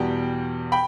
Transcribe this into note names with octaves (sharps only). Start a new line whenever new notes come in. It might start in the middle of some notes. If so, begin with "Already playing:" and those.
Already playing: E2 B2 G3 G5
G5 B5